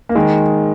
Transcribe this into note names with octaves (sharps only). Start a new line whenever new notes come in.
A#3
D#3 G#3